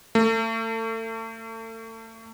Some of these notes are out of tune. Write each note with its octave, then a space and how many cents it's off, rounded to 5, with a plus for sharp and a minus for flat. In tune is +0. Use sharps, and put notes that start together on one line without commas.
A3 +35